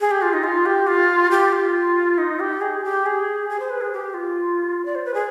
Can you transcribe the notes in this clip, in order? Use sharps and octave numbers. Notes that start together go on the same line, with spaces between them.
G#4
G4
F4
D#4
F4
G4
F4
G4
F4
D#4
G4
G#4
G4
G#4
G#4
C5
B4
G#4
G4
F4
D5
C5
B4
G#4